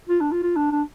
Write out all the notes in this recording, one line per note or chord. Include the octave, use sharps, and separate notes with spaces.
F4
D4
F4
F4
D4
D4